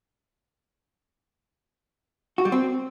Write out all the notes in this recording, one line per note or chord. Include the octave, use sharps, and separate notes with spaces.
F#4
G3
C4